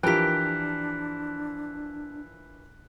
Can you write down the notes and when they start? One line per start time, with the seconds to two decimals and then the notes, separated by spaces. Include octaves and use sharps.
0.03 E3 F3 D4 G4 A#4 G5 F#6 B6